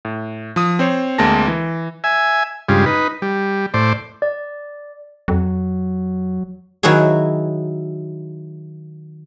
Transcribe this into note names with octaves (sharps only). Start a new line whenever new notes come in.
A2
F3 D#6
C4 C5 C#5
D2 G#3 A#3 C4 A5 A#6
E3
E5 G#5
G2 C#3 G3 G#3 F4
D#4 B4
G3
A2 C5 D5
D5
F2 F#3
D#3 F#3 E4 F#4 G#4